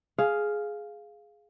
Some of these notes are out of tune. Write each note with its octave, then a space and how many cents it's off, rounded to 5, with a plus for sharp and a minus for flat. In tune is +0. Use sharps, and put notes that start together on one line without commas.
G#4 +10 F5 +0